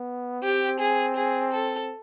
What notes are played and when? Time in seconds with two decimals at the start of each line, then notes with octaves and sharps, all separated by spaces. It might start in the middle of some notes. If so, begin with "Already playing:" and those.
Already playing: B3
0.43 C4 G4
0.79 G#4
1.16 G#4
1.53 A4